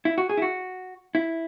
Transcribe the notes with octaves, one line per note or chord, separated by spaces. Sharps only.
E4
F#4
G#4
E4
F#4
E4